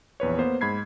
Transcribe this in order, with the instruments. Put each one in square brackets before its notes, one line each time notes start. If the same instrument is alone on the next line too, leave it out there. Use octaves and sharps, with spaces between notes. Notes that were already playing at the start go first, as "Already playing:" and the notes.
[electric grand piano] A#1 E2 B4 C#5
A#3 B3 C5
G#2 B5 G#6 C7